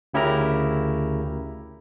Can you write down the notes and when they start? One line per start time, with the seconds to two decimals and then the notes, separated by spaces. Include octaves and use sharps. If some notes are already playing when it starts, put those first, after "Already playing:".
0.14 D2 C#3 E4 G4 A#4 A#5